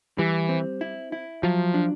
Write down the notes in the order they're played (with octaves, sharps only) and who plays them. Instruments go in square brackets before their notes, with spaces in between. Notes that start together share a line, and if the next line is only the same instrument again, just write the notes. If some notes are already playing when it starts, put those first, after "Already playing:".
[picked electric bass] E3 [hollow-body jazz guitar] G3
[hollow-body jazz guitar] C4
E4
E4
[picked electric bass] F3 [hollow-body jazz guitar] F#3
[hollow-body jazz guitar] D4